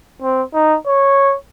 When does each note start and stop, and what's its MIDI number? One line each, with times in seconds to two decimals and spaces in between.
0.22 0.42 60
0.54 0.77 63
0.87 1.36 73